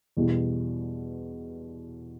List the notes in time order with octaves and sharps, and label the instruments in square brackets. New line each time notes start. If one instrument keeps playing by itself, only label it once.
[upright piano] E2 B2 G3